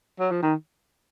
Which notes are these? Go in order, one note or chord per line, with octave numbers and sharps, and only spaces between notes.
F#3
F3
D#3